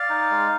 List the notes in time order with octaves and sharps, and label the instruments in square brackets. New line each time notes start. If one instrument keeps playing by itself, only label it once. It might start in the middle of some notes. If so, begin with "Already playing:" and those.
Already playing: [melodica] D5 F5
D#4
G#3